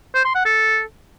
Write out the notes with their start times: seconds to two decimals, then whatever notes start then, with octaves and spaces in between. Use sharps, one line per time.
0.14 C5
0.25 C6
0.35 F#5
0.45 A4